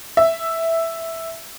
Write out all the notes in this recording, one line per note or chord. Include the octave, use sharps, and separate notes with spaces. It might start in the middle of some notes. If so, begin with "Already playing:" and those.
E5